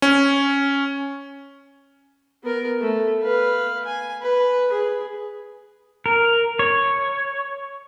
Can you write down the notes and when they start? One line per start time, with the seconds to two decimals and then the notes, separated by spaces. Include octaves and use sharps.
0.02 C#4
2.44 B3 A#4
2.81 A3
3.22 B4 F5
3.86 G#5
4.21 B4
4.72 G#4
6.06 A#4
6.59 C#5